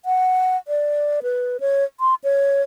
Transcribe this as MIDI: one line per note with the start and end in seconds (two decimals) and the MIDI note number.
0.05 0.57 78
0.68 1.20 74
1.23 1.57 71
1.60 1.84 73
2.00 2.15 84
2.24 2.62 73